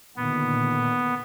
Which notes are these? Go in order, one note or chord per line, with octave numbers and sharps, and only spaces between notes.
A#2 D3 D#3 B3